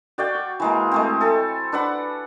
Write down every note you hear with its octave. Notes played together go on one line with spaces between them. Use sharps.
F#4 D5 F5 G5
C#6
E3 G#3 A#3
G#3 A3 C4
A4 G#5
D4 B4 F#5